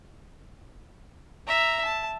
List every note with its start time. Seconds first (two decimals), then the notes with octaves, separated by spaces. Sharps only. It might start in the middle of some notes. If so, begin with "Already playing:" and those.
1.47 E5 A#5
1.84 A5